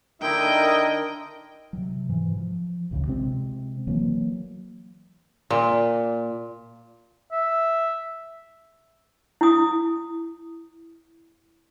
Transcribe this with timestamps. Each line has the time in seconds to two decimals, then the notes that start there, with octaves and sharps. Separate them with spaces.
0.22 D3 D#4 E4 A#4 D#5 G5
1.73 C3 F#3
2.09 G#2 E3
2.37 F3
2.91 A1 D2 C#3
3.07 C3 G#3 C4
3.87 E3 F#3 A#3
5.50 A#2
7.31 E5
9.41 E4 D#6